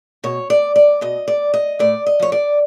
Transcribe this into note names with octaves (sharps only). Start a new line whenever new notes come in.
B2 C#5
D5
D5
B2 D#5
D5
D#5
A2 D5
D#5
F3 C#5
D5